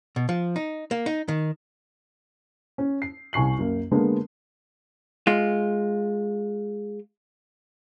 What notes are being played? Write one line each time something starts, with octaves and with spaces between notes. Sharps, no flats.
B2
F3
D#4
A#3
D#4
D#3
C#4
C7
C2 G#5 C#6 C7 F#7
F#2 A#3
D3 G#3 A#3 B3 D4
G#3 F4